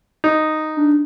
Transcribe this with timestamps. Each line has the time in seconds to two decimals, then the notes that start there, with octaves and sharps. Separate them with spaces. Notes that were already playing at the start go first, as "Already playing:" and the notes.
0.24 D#4
0.77 D4